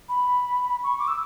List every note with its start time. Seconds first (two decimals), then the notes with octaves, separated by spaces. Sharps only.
0.09 B5
0.84 C#6
0.99 D6
1.08 E6